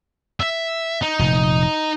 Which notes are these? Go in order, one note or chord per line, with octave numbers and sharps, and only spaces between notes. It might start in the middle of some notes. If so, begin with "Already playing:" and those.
E5
D#4
F1 A#2